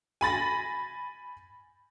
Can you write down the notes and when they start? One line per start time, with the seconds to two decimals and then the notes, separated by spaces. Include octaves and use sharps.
0.21 G#5 B5 A6 A#6